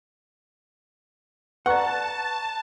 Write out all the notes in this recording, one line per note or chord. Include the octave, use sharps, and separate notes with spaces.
B4 D5 F#5 A5 A#5 C#6 F#6